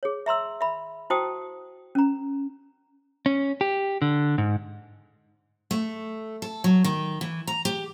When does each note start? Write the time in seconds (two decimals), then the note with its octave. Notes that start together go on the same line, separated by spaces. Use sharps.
0.03 G#4 C#5
0.26 E5 A#5 C6 E6
0.61 E5 B5
1.10 E4 F#4 C5 G5 A5 D#6
1.95 C#4 A#5
3.26 C#4
3.61 G4
4.02 D3
4.38 G#2
5.71 A3
6.42 A4
6.64 F#3
6.84 D#3
7.21 E3
7.47 A#5
7.65 G4